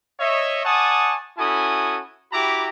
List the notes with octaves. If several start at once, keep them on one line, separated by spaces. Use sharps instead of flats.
C#5 D#5 E5
D5 F#5 G#5 A5 C#6 D#6
C#4 E4 F#4 A4 G#5 D#6
E4 F#4 G4 A#5 B5 D6